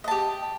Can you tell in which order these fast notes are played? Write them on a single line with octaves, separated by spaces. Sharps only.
D#5 A5 G4